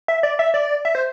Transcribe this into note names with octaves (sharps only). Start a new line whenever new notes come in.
E5
D5
E5
D5
E5
C5